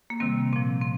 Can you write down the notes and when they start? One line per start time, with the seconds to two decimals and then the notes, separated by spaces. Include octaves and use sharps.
0.10 A#3
0.20 C3 D#3 G3 C4
0.53 A#2 F3 C4
0.81 C4